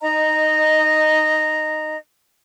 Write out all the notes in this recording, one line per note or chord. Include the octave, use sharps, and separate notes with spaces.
D#4 D#5 A#5